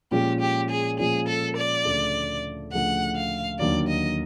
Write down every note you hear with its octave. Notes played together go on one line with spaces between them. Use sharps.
A#2 F3 G#3 C#4 F4 G4
G4
G#4
A#2 F3 G#3 C#4 F4 G#4
A4
D5
D2 C#3 F3 A3
D2 C#3 F3 A3 F#5
F5
D#2 D3 F#3 A#3 D5
D#5